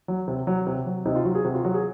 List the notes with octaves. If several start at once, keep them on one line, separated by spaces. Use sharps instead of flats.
F#3
C3
F#3
C3
F#3
C3 D#4
F4
F#3 F#4
G#4
C3 F#4
F4
F#3 F#4
G#4